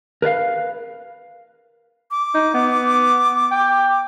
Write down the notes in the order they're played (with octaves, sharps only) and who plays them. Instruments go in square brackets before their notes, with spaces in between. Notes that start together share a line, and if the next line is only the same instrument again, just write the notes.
[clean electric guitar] A#4 B4 D5 F5
[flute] D6
[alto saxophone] D#4
B3
G5